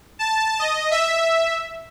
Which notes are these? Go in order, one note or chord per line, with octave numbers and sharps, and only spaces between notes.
A5
D#5
E5